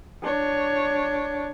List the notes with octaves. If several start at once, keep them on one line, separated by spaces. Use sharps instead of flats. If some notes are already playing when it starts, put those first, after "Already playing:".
D4 C#5